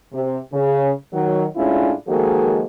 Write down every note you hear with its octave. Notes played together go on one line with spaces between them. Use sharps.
C3
C#3
D#3 F#3
A2 G#3 C#4 D4 E4 F4
D#3 F3 G#3 A#3 F#4 A4